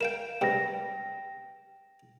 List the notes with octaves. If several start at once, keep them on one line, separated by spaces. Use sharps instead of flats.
A#4 F5 G5 E7
G2 C3 G5 A#6